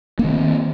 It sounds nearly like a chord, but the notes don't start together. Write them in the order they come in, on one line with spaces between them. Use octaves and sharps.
A#3 D4 D#3 C4